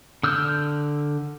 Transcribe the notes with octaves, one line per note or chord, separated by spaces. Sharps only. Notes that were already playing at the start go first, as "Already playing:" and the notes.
D3 E6 F6 G6